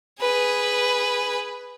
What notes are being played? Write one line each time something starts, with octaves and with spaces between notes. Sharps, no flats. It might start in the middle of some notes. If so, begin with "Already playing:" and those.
G#4 B4